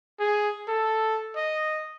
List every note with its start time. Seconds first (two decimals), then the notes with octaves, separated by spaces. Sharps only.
0.19 G#4
0.68 A4
1.36 D#5